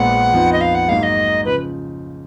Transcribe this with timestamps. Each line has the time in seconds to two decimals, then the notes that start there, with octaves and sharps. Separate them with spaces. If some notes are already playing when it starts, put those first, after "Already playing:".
Already playing: A#1 A#2 G#3 B3 F#5
0.33 F2 F3 B3 D#4
0.53 D#5
0.61 F5
0.75 F#5
0.89 G#2 F#3 A#3 D#4 F5
1.03 D#5
1.45 C#3 F3 B4